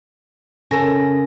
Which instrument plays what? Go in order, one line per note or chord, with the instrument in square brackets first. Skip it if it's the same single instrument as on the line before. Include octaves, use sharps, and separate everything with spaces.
[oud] C#3 A4 A#4 [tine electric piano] C#4 G#5 A#6